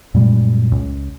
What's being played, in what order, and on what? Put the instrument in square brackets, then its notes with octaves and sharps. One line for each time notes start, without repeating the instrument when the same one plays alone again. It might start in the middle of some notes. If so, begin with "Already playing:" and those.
[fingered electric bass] F#2 A#2 G3 G#3
C#2